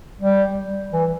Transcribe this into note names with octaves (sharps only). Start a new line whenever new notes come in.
G3
E3